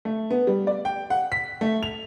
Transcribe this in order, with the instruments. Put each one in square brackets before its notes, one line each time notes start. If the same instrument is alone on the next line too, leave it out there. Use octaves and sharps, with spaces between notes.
[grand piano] A3
B3
G3
D5
G5
F#5
B6
A3
F7